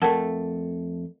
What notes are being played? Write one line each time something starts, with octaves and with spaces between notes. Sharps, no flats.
F2 A3 A#4 F#5 A5